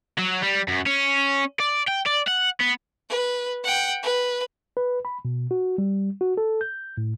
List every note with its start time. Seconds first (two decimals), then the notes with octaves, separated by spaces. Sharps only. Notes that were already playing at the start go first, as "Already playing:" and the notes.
0.18 F#3
0.42 G3
0.68 F#2
0.86 C#4
1.60 D5
1.88 G5
2.07 D5
2.28 F#5
2.61 B3
3.09 B4
3.64 F#5 G5
4.03 B4
4.77 B4
5.05 B5
5.25 B2
5.51 F#4
5.78 G3
6.21 F#4
6.37 A4
6.61 G6
6.98 A2